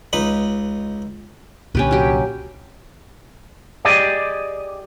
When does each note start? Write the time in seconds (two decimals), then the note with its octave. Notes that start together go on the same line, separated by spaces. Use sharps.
0.13 C#2 D#4 B4 B5
1.75 C2 A#2 D3 C#4 G4 B4
1.91 F#3 G4
3.85 G4 G#4 D5 D#5